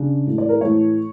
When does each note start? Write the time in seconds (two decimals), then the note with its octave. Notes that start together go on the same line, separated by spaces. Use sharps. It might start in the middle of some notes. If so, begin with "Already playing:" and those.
Already playing: C#3 D4
0.26 A2 E3 A3
0.38 D5
0.49 A#4
0.61 A2 E3 A3 C#5